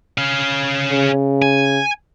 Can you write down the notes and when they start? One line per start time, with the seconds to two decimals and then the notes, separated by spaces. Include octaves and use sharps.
0.18 C#4 F5
0.91 C#3
1.42 G#5